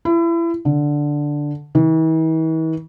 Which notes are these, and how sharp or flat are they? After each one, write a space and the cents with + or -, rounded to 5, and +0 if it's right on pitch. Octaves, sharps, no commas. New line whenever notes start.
E4 +30
D3 +0
E3 -45